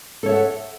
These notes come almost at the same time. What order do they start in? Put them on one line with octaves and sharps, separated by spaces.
A4 C#5 E5 F#5